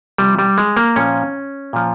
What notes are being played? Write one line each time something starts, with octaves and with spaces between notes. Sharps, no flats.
C3 F3 G3
G3
G#3
A#3
A#2 F3 C#4
A#2 F3